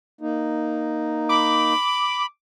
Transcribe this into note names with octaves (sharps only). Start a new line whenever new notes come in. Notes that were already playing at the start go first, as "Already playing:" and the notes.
A#3 D#4
B5 D6